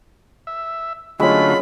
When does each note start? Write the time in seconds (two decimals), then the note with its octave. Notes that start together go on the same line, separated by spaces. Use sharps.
0.47 E5
1.20 D3 F#3 G#3 A3 C#4 F4 B5